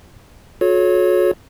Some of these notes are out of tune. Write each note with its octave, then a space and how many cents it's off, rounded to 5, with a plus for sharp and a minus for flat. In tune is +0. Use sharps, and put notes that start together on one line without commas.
F#4 -40 A4 -45 C#5 +0